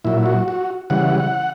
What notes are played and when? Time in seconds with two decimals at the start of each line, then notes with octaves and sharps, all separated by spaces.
0.05 A#2 F#3 E4
0.26 F#4
0.48 F#4
0.90 C#3 E3 G3 F#5
1.20 F#5